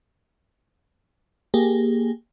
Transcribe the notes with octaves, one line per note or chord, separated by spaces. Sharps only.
A#3 G4 G#4